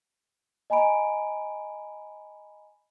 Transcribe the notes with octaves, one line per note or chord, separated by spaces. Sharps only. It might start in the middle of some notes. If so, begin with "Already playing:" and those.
D#5 G#5 A#5 B5 D7